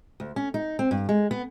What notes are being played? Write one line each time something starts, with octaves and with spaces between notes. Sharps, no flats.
D2
C#4
D#4
C4
G2
G#3
B3